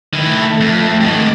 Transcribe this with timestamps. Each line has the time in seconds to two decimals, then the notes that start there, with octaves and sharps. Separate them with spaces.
0.13 D#3 A3 E4 A4
0.60 F2 A3
1.00 G#2 D#3 D6